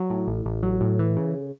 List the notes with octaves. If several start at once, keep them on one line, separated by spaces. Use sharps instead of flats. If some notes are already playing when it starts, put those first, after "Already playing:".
Already playing: F#3
A2
A1
A1
F#3
A2
E3
C#3